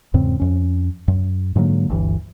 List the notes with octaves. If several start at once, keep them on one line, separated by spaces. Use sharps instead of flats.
E2 G#2 C#3 C4
F2 C#4
F#2
G#2 D3 F#3 A#3
G1 D2 G2 E3